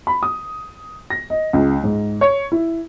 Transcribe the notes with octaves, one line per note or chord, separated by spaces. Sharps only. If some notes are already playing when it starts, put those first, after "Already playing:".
B5
D#6
A#6
D#5
C#2
G#2
C#5
E4